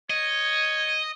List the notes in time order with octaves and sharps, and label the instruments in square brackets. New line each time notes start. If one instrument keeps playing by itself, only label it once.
[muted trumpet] C#5 [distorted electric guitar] D#5